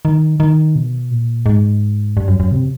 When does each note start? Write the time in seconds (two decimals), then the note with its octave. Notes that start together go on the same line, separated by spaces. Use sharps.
0.05 D#3
0.40 D#3
0.76 B2
1.11 A#2
1.46 G#2
2.17 G2
2.28 F#2
2.40 F#2
2.52 C3